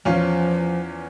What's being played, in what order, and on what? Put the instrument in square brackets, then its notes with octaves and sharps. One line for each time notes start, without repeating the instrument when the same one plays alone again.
[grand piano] E2 C#4 F4 [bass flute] F3